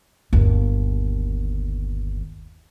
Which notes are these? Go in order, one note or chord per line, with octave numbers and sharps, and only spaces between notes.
G1 D#2